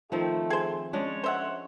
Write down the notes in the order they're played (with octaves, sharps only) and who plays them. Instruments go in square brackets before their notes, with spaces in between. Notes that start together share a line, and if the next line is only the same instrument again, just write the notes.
[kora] D#3 F3 C4 [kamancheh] A3
[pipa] G#4 C5
[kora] G#3 C#4 D4 [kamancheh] C#5
[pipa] C5 E5 F#5